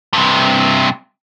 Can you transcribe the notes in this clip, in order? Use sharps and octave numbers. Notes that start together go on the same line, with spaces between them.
G2 C3